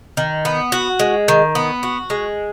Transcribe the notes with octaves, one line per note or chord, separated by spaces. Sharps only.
D#3
B3
F#4
G#3
D#3
B3
F#4
G#3